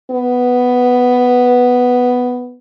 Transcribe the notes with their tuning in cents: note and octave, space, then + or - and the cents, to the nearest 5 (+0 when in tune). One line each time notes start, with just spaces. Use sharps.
B3 +5